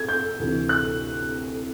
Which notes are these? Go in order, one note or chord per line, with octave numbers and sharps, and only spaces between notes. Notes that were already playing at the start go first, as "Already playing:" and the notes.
Already playing: G#6
G6
D2 C3 E3
F#6